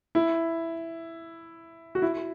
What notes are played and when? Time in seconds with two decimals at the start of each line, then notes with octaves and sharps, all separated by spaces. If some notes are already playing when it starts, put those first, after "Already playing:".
0.15 E4
1.95 F#4
2.02 E4